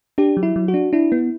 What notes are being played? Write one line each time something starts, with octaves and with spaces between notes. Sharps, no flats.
D4 G4
F#3
E4
F#3
F#4
D4
D4 E4
B3